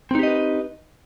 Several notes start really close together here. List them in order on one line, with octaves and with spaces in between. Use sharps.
C4 D#4 G4 D#5 B4